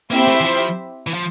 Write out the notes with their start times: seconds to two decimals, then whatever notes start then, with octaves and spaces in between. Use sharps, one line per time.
0.11 A#3 C4 E4 G4 C5 E5
0.28 A3
0.41 E3
0.45 F3
1.07 E3
1.14 F3